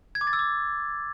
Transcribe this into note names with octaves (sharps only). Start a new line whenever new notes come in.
G#6
D6
A6
E6
D6